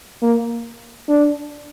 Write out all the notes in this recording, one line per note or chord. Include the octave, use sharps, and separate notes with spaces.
A#3
D4